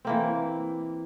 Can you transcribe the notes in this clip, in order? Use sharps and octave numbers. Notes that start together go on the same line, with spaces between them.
E3 A#3 C4